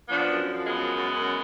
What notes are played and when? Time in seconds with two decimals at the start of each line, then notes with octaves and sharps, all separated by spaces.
0.09 F3 B3 D4
0.31 F#2
0.52 F3
0.66 G#3 B3
0.73 F#2
0.94 F#2
1.16 F#2